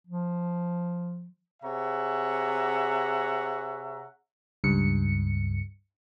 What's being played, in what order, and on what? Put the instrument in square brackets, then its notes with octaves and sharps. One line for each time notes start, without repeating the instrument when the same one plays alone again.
[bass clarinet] F3
[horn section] C3 G#4 C#5 E5 F#5 A#5
[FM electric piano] C#2 G2 C#7